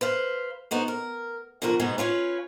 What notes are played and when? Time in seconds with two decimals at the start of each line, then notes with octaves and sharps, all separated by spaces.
0.01 B4 C5 F5
0.71 B3 D#4 F#4 C5
0.88 A#4
1.62 B2 D3 F3 F#4 A#4
1.79 G#2 B2 G#3 B3 D#4
1.98 C#4 F4 B4 C#5